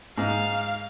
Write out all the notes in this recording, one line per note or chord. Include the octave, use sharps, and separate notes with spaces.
G#2 F5